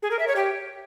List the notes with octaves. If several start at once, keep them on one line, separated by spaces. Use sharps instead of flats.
G#4
A#4
E5
C#5
G4